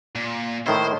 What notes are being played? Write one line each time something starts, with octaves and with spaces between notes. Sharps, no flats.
A#2
A2 D#3 E4 C5